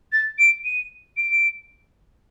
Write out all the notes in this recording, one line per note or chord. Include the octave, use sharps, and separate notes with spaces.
A6
D7
D#7
D7